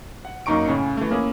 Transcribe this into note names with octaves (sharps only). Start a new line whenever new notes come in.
F#5
F#2 A#3 D#4 A#5 C#6 D7
A2 C#3 C#4
E3 A3
A#3 C#4 E4 G#4